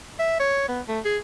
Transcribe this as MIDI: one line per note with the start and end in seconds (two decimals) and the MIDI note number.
0.19 0.37 76
0.40 0.68 73
0.68 0.81 59
0.88 0.99 57
1.05 1.18 68